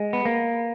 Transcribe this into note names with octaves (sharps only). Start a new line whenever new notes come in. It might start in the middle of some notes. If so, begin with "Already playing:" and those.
Already playing: G#3
B3
A#3